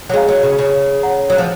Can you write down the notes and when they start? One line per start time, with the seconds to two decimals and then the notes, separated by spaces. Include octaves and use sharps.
0.09 F#3
0.13 G#3 G#4 C#5 F5 A#5
0.29 F#3
0.43 C#3
0.59 C#3
1.03 C#5 F#5 A#5
1.30 F#3
1.38 F3